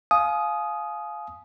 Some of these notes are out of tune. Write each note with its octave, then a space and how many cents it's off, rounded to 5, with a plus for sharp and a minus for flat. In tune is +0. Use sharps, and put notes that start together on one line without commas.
F5 +0 G#5 +35 D#6 +0